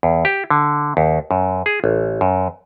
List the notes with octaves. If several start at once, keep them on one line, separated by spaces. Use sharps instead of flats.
E2
G4
D3
D#2
F#2
G#4
A1
F#2